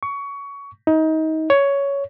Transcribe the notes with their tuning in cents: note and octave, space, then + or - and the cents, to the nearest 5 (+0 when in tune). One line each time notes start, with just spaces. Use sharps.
C#6 +20
D#4 +25
C#5 +10